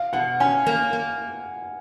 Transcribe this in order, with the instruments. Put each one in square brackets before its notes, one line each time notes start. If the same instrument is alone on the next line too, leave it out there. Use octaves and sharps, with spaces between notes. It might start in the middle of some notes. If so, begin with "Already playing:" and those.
Already playing: [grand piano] F5
[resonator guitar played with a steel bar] B2 [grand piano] F#5
[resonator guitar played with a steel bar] C#4 [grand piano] G#5
[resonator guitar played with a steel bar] A#3
A#3